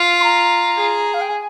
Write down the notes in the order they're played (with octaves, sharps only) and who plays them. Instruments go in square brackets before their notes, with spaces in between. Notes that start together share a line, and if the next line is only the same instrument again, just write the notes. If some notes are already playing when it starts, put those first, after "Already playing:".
Already playing: [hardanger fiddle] F4
[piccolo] C6
A#5
[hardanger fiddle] G#4
[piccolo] F5
G5
G#5